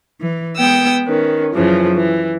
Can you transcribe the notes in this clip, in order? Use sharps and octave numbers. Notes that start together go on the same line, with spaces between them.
E3
G#3 B3 G5 D#6 E6
D#3 C#4 B4
F#2 C#3 E3 F3
E3